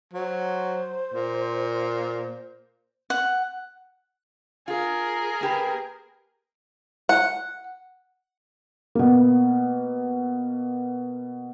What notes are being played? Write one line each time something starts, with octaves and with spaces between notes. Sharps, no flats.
F#3 C5
A#2
F#5
F4 G#4 A#4
A#3 G4 B4
F#5
B2 A#3